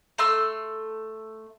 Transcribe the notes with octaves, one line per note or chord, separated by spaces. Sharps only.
A3 C6 E6